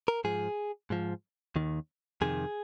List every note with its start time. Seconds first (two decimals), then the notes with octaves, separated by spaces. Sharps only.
0.08 A#4
0.24 G#2 F3 G#4
0.90 G#2 F3
1.56 D#2 D#3
2.21 F2 C3 D#3 G#4